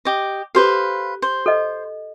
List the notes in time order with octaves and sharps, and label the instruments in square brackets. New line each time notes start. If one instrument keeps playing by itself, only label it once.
[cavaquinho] G4 D#5
[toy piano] G4 A4 [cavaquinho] B4 C5 F5
[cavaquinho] C5
[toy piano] A4 D#5